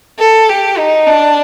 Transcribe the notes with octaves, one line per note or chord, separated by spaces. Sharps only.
A4
G4
D#4
D4